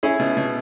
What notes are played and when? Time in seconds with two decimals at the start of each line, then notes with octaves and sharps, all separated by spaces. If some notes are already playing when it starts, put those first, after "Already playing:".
0.03 C#4 E4 G#4
0.19 B2
0.37 B2